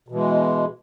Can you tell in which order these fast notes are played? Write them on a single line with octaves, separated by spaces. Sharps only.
B2 E3 G#3